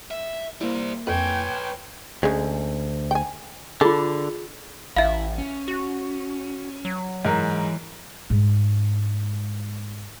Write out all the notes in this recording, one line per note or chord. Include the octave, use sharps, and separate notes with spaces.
E5
G3 A#3 E4 C5
F2 B4 C#5 G5 G#5 G#6
D2 C#3 G#3
G5 G#5
D3 F4 G#4 A4
A1 E4 E5 F5
C#4
F#4
F#3
G#2 E3 A#4
G#2 G#3